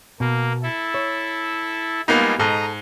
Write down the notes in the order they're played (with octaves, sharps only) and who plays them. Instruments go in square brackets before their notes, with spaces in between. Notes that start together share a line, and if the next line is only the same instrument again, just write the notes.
[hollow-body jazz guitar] B2 [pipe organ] A#3
[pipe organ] E4 A4
[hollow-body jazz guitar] C#5
[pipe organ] G3 G#3 F4 [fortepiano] A#3 B3 D#4
[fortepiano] G#2 [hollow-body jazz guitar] A4 [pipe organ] D#5 A#5